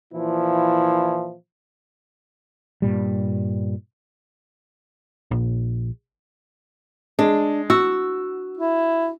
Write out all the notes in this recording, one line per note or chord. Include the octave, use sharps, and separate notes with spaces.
A#2 E3 F3 E4
G2 A#2 G3
A#1
G#3 D4
F#4 E6
E4